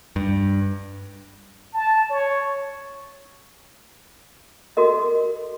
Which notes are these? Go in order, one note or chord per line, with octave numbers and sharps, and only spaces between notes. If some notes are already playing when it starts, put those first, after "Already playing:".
G2
A5
C#5
F#4 A4 A#4 D#5